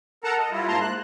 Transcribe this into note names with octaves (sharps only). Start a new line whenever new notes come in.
A4 A#4 F#5 A5 A#5
D#5
G3 E4 F4
G#2 A#3 A5 A#5 C6
F#6